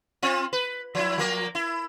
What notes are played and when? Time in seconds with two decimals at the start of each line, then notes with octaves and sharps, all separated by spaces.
0.22 C4 F4
0.53 B4
0.95 F3 E4
1.18 F3 A#3 A#4
1.55 E4